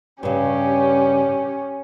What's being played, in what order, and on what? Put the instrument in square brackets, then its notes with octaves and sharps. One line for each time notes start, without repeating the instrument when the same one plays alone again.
[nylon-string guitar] G2 C#3 [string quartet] C#4 [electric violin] G4